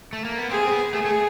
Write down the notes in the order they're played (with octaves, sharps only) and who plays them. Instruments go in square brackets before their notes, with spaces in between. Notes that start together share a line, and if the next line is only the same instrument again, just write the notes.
[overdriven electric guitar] A3
A#3
B3
[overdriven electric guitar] C4 [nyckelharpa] G#4
[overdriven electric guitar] C4
B3
[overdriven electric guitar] A3 [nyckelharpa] G#4
[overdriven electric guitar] A3